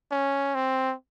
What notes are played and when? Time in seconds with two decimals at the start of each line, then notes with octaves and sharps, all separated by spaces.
0.11 C#4
0.55 C4